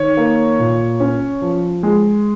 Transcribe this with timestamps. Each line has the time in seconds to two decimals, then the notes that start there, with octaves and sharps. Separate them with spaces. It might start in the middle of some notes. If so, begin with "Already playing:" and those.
Already playing: D#3 C#5
0.17 A#3
0.59 A#2
1.00 C#4
1.42 F3
1.83 G#3